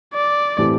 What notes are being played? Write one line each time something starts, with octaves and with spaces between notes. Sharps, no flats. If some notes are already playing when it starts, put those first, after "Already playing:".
D5
A2 E3 A3 C4 G4